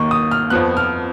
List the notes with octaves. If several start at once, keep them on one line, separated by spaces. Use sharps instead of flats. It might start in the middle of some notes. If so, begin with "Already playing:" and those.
Already playing: D#2 D#3 A#3 C#6
D#6
F6
F2 F3 B3 F#6
F6